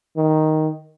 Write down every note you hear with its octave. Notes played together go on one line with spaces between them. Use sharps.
D#3